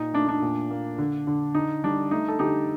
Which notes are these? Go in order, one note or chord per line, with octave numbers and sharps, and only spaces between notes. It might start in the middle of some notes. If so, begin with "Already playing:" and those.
Already playing: A#2 D#4
A3 D4
D4
A#2
A#3
D3
D3
D3 D#4
G3 D4
A3 D#4
A4
D3 D#4 G4